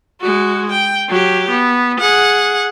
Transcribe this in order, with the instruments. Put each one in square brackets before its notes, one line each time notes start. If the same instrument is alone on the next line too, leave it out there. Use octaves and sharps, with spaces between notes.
[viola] G#3 F#4
G5
F#3 G4
B3
G#4 F#5